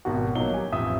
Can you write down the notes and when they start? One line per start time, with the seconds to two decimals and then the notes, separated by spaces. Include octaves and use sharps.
0.05 G#1 B2 F#4
0.35 A#1 F#3 A#3 D#4 G7
0.52 G4 G#5
0.72 A1 F2 E5 D#6